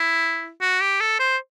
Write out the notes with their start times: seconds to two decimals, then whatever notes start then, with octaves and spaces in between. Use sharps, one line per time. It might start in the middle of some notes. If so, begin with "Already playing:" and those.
Already playing: E4
0.61 F#4
0.81 G4
1.00 A4
1.20 C5